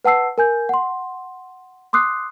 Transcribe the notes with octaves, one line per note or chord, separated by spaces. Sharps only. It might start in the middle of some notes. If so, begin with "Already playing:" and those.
B4 F#5 A5 E6 C7
A#4 G#5 G6
F#5 C6
C6 D6 D#6 F#6 C7